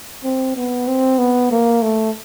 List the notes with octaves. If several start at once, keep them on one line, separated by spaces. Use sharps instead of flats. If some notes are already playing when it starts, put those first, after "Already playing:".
C4
B3
C4
B3
A#3
A3